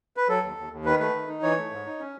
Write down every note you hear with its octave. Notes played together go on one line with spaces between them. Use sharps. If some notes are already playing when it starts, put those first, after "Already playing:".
B4
F#3 A4
D#2
D#2
D#2
D#3 B4
A3 B4
D#3
D#4
E3 C#5
A3
G#2
D#4
C#4